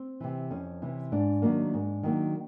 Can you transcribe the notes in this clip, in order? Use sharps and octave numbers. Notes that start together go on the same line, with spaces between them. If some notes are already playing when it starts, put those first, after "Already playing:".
Already playing: C4
C3 E3
F2 C#4
C3 E3
G#2 D4
D#3 F#3 A#3
G#2
D#3 F#3 A#3